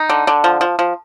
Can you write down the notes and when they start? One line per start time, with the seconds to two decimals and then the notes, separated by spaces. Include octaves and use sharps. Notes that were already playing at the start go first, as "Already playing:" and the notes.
Already playing: D#4
0.09 D3
0.27 D3
0.44 F3
0.61 F3
0.79 F3